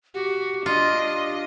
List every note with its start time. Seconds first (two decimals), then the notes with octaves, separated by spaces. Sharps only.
0.14 F#4 G4
0.66 D4 F4 D#5